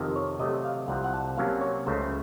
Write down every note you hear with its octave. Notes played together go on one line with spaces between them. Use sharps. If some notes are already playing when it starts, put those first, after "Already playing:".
Already playing: F2 C3 D#3
C#5
C3 F#3 A3 D#5
F5
C2 C3 F3 C4 F#5
F#5
A5
C3 F#3 A#3 C#4 F5
C#5
C#2 C#3 A3 C5